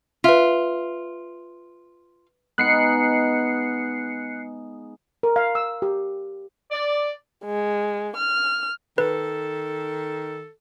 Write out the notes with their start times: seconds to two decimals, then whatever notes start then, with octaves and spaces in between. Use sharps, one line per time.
0.24 F4 B4 E5
2.58 G#3 B3 D#4 F#6 C7 C#7
5.23 A#4
5.36 F5
5.55 E6
5.82 G4
6.71 D5
7.45 G#3
8.17 F6
8.98 D#3 A4 B4